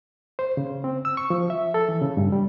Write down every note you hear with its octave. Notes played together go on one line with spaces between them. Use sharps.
C5
C#3
C4
E6
C#6
F3
E5
A4
E3
C#3
G2
G3